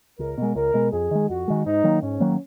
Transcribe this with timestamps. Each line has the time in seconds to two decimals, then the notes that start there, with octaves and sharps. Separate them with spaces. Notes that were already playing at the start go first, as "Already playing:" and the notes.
0.19 C#2 A#4
0.38 B2 G#3
0.55 C#2 A#4
0.74 B2 G#3
0.92 F2 G#4
1.11 D#3 G#3
1.29 F2 F#4
1.48 D#3 G#3
1.66 G#2 D#4
1.84 D#3 F#3 A#3
2.02 G#2 C#4
2.20 D#3 F#3 A#3